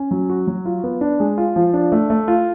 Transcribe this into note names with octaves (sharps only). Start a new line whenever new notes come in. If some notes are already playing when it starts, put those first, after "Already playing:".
Already playing: C#4
F#3
F#4
F#3
F4
B3
D4
G#3
F4
F3
D4
A3
A3
F4